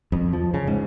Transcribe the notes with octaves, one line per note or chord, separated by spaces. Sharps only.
F2
F3
C#3
G#2